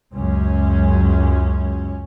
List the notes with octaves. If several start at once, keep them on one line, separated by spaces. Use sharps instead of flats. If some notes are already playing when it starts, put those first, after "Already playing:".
C#2 F#2 C#4